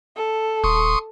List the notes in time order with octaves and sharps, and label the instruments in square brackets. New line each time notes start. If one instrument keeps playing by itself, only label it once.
[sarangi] A4
[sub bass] D#1 [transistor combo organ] C6 C#6 D#6